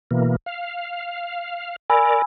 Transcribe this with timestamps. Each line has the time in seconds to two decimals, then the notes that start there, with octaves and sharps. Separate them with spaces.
0.11 B2 E3 A#3
0.46 F5
1.90 A#4 D5 G#5 B5 E6